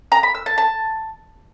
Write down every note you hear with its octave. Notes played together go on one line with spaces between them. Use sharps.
A#5
B5
E6
A5
A5